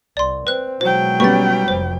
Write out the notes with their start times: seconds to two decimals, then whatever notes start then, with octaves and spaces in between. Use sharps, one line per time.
0.17 C2 D5 C6
0.47 C4 B4 F#6
0.81 B2 F#3 G#3 C5 G5
1.20 G3 B3 C#4 C#6 A6
1.68 F1 C5